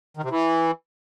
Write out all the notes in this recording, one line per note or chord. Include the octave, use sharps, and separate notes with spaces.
D#3
C3
E3